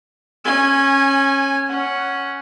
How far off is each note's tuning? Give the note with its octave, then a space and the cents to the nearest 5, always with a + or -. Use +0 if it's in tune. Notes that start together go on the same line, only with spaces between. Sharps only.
C#4 -20 G#5 +0
C#4 +0 F#5 +0